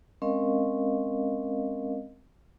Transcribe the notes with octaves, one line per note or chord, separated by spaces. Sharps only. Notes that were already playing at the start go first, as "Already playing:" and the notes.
G#3 C4 C#4 A#4 D#5 F5